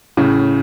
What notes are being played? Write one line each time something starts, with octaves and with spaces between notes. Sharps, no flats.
A2 C#3